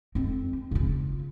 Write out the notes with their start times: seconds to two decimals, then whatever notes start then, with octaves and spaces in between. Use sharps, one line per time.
0.15 F2 C4
0.71 C#3 F4